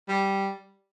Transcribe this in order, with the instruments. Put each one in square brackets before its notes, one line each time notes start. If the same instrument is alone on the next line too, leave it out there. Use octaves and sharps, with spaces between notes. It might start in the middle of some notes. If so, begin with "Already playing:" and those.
[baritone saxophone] G3